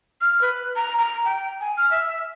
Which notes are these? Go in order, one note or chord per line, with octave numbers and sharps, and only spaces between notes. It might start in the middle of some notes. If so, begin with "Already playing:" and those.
F6
B4
A#5
A#5
G5
G#5
F6
E5